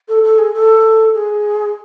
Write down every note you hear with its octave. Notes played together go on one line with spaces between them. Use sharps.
A4
A4
G#4
A4
G#4